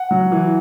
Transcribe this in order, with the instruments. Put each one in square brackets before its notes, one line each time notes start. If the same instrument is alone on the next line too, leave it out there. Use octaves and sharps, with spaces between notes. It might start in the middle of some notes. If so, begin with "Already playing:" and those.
Already playing: [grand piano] F#5
F#3
E3